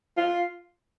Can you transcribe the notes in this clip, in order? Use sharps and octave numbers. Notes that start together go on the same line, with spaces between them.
F4